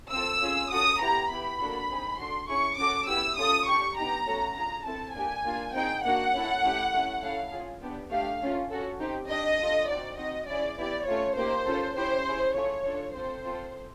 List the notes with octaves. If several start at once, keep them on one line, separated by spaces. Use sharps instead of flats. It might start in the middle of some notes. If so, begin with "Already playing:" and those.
C4 F4 A4 E6
C#4 F4 G#4
C#4 F#4 A4 D#6
B3 E4 G4 A#5
B3 E4 G4 B5
A#3 D4 F#4 A4
C4 D#4 G#4
D4 F#4 A4 C6
C#4 E4 G#4 C#6
C#4 F#4 A4 D6
B3 E4 G4 E6
C#4 F4 A4 D#6
D4 G4 C#6
B3 D#4 G4 A#5
A3 C#4 F#4 A4
D4 F4 G#4 A#5
C4 E4 A4 A5
A#3 D4 G4 G#5
A#3 D4 F4
C4 D#4 G#4 G5
A#3 D4 F#4 F#5
C#4 E4 A4
A3 C#4 E4 G4
A3 C#4 E4
A3 C#4 E4 A4 F5
C#4 F4 G#4
B3 D4 G4
A3 D4 G4 F5
A3 C#4 F4
C#4 F#4 A4
C4 D#4 G4
D4 G4 D#5
D4 F4 A4
C4 D#4 F#4 D5
C4 D#4 F#4 D#5
C#4 E4 G#4 D5
B3 E4 G4 D5
A3 C#4 F4 C#5
A#3 D#4 G4 C5
C#4 F4 A4
C#4 E4 G4 C5
C#4 E4 G#4
A3 C#4 F4 G#4 C#5
D4 F4 A4
C4 F4 A4 C5
C4 F4 A4